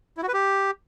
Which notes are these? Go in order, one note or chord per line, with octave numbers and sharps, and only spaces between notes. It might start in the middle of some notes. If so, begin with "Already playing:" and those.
E4
F#4
B4
G4